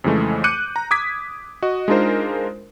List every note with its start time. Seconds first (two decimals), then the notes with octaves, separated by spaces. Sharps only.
0.04 F2 C#3 E3 G#3 A3
0.44 D6 F#6 G6 C#7 D#7
0.76 A#5
0.91 D6 D#6 G#6 B6
1.62 F#4 D#5
1.88 G#3 D4 D#4 F4 A#4 C5